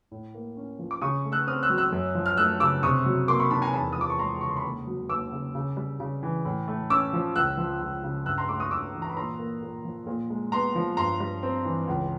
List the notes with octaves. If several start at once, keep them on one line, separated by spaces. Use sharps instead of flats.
A2
A#3
C#4
F3
D6
C#3 C#6 D#6
A3
E6 F#6
C4 D#6 F6
E6 F#6
F#3
E6 F#6
F#2
F3
F6
A3 E6 F#6
C#3 D6 E6
C3 C#6 D#6
F#3
A#3 C6 D6
B5 C#6
D#3 A5 B5
G#5 A#5
E2 A5 B5
F3 D#6
D6
C#6
G#3 A#5 C6
C#3 C#6
C6
B5 C#6
D#2
F#3
D#2 D6 E6
C#3
C#3
G3
C#3
E3
A2
A3
C#4 D6 E6
F3
C#2 E6 F#6
F3
C#2
C#3
G2 E6 F#6
A#5 C6
A3 C6 D6
C#6 D#6
G2 D6 E6
E3
A#5
B5
A#2 A#5 C6
A#3
A#2
F3
A#2
G#3
B3 A#5 C6
F3
G2 A#5 C6
G3
C4
E3
C#2